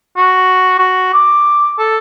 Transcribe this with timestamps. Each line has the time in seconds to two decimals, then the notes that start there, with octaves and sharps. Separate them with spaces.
0.17 F#4
0.79 F#4
1.13 D6
1.79 A4